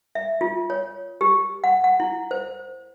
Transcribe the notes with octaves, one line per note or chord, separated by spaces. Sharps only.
E5
F4
C#5
G4
F#5
F#5
E4
C5